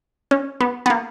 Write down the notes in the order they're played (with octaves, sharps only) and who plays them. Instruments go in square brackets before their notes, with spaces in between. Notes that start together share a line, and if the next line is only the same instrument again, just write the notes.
[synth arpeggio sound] C#4
B3
B3
A#3